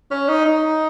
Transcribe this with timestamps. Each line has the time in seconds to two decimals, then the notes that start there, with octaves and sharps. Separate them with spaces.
0.11 C#4
0.28 D#4
0.46 D#4